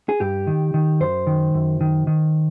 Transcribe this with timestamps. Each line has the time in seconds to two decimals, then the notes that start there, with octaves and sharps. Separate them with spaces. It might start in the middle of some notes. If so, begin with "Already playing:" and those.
0.09 G#4
0.20 G2 G4
0.47 D#3
0.74 D#3
1.00 F#2 C5
1.27 D#3
1.55 F#2
1.81 D#3
2.07 D#3